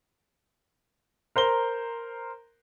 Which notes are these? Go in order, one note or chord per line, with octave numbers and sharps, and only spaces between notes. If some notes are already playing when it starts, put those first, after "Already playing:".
A#4 C5 A#5 G7